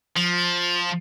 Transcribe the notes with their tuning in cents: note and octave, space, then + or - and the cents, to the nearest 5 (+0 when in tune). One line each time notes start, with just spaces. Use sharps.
F3 +10